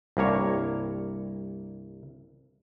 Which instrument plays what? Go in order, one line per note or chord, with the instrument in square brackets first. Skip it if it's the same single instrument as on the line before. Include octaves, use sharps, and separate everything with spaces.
[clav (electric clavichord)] C2 G2 A#3 C#5